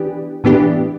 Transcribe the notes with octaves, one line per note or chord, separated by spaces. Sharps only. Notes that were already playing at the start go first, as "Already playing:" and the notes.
Already playing: E3 B3 D4 G4
A2 E3 B3 D4 G4